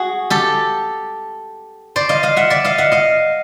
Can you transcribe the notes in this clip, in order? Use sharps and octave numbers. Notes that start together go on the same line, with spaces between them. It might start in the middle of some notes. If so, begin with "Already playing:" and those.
Already playing: F#4 G#4
G4 A4
C5 D5
D#5 F5
D#5 F5
E5 F#5
D5 E5
D#5 F5
E5 F#5
D#5 F5